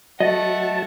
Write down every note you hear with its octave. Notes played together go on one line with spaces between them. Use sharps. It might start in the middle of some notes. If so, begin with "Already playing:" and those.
F#3 A3 D#5 F#5 A5